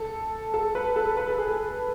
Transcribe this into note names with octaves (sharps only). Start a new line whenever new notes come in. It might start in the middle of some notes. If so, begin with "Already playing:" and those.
Already playing: A4
A4
B4
A4
B4
A4
G#4
A4